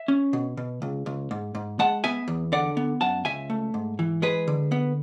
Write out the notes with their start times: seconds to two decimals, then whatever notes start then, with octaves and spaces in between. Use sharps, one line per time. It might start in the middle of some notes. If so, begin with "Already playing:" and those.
Already playing: E5
0.08 C#4
0.33 B2
0.57 B2
0.82 C#2
1.06 C#2
1.31 G#2
1.55 G#2
1.79 G#3 F#5 A5
2.04 B3 E5 G#5
2.28 E2
2.52 D3 D5 F#5
2.77 B3
3.01 F#2 F#5 A5
3.25 C#2 E5 G#5
3.50 A3
3.74 G#2
3.99 E3
4.22 G#3 G#4 B4
4.47 D3
4.72 B3